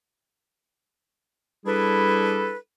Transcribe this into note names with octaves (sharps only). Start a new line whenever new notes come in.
G3 D4 E4 G#4 A4 B4